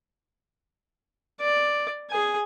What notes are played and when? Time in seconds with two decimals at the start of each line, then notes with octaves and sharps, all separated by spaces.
1.41 D5
2.11 G#4 G#5